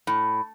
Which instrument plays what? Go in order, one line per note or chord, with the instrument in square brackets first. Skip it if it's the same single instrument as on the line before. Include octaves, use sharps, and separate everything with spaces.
[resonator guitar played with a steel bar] A2